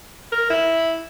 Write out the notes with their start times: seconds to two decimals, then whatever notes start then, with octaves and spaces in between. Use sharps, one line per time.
0.32 A#4
0.50 E4